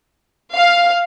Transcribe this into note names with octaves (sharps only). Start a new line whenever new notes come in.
F5